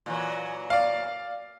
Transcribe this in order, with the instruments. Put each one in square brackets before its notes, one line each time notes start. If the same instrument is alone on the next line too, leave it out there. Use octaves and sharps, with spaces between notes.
[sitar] A#2 E3 F#3
[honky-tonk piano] D5 F5